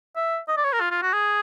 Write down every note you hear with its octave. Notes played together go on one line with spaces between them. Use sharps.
E5
D#5
D5
C#5
A#4
F4
F4
F#4
G#4